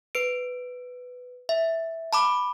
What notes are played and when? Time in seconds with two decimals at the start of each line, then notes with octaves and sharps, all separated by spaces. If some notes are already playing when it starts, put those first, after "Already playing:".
0.15 B4 D7
1.49 E5
2.13 A5 B5 D6